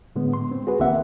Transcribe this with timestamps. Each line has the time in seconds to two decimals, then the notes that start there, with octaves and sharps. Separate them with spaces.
0.16 A2 D3 G#3 B3
0.34 C6
0.51 C4
0.67 F#4 G#4 B4
0.79 C2 D#3 A#3 C4 E5 F#5